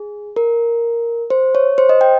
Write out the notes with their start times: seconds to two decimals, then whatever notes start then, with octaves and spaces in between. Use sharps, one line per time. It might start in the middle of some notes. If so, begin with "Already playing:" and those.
Already playing: G#4
0.36 A#4
1.30 C5
1.55 C#5
1.78 C5
1.89 D#5
2.01 G5